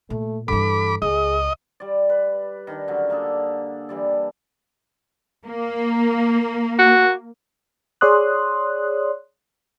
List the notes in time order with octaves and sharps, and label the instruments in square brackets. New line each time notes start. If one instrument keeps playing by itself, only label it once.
[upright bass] A#2 [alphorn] A3
[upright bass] G2 E3 [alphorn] A4 [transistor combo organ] B5 D6
[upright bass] C#2 [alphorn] G#4 [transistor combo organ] D#5
[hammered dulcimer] G3 D5
B4
D#3 D4
D3 F#3 C#4
A#3 D4 G#4 A4
E3 G3 D5
[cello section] A#3
[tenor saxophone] F#4
[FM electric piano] G#4 C#5 D5 C6 D#6 F#6